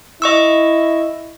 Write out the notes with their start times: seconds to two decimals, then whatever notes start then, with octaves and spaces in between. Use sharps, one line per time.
0.22 E4 D#5 C#6 E6